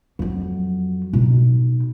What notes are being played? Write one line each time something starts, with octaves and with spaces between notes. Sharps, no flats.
F2 F#3
B2 D#4